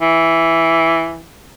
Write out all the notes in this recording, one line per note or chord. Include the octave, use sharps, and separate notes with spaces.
E3